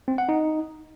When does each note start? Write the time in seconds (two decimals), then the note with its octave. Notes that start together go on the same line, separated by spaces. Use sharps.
0.08 C4
0.18 F#5
0.29 D#4